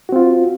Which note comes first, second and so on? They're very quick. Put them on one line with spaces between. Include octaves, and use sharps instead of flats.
F#4 C4 F4